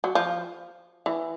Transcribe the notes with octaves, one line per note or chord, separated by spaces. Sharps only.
F#3
F3
E3